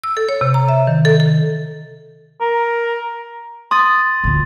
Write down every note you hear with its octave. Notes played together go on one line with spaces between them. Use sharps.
E6
A4
C#5
C3
A#5
E5
D#3
A4
A4
A#4
C6 D#6 A6
D2 A#2